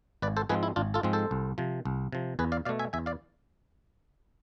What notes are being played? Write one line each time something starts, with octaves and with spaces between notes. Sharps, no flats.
G#1 B4 D5
A4 C5
G#2 F3 G#3 C4 G#4 B4
E4
G#1 D4 F4
F4 A4
G#2 F3 G#3 C4
A4 C5
C2
C3 F3
C2
C3 F3
E2 G#4 B4
D5 F5
B2 A3 D5 F5
E5 G#5
E2 E5 G#5
D5 F5